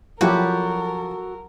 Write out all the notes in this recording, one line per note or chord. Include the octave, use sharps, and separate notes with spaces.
F3 F#3 E4 F#4 G4 A4 A#4